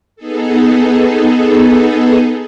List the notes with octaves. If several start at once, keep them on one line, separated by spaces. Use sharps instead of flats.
B3 D#4 G#4 A4